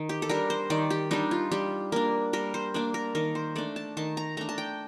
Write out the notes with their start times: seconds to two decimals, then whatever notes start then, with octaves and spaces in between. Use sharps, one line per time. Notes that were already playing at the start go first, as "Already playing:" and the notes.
Already playing: D#3
0.09 G4
0.22 A4
0.29 G3 D4 A#4
0.50 C5
0.70 D#3 D5
0.90 G4
1.11 G3 D4 D#4
1.31 F4
1.52 G3 G4
1.92 A#3 D4 A#4
2.33 G3 A#4
2.54 C5
2.74 A#3 D4 D5
2.94 A#4
3.15 D#3 A#4
3.35 C5
3.56 A3 D4 D5
3.76 A5
3.97 D#3 A5
4.17 A#5
4.37 A3 D4 A#5
4.49 A5
4.58 G5